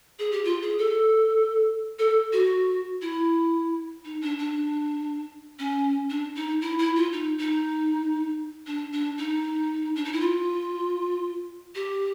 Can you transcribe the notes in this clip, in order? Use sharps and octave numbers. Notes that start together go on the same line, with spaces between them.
G#4
G4
F4
G#4
A4
A4
F#4
E4
D#4
D4
D4
C#4
D4
D#4
E4
E4
F4
D#4
D#4
D4
D4
D#4
D4
D#4
E4
F4
G4